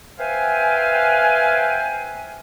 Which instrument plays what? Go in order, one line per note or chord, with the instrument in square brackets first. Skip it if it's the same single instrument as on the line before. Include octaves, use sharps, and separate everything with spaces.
[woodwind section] B4 C5 E5 F5 G5 G#5